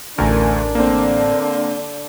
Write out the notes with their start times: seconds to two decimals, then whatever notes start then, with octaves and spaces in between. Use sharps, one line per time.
0.18 A1 D2 A3 D4 A#4 G#5
0.75 D3 A#3 C4